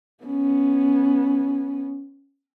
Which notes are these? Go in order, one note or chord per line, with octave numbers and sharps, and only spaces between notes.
B3 C#4